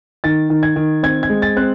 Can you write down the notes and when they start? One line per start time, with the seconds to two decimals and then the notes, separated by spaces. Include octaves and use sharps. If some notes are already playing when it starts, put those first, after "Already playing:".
0.24 D#3 A6
0.50 D#3
0.63 G#6
0.76 D#3
1.03 C4 G#6
1.23 G#6
1.29 G#3
1.42 A6
1.57 C4 F#6